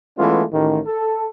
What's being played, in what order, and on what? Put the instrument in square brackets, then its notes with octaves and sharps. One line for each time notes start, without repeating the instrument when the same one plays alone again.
[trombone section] E3 G#3 A3 B3 C#4 F4
A1 D#3
A4